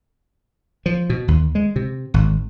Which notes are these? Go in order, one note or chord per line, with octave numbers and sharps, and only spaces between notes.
F3
B2
D#2
G#3
C3
G#1